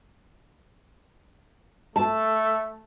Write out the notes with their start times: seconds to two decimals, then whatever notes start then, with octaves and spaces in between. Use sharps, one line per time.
1.96 A3 A5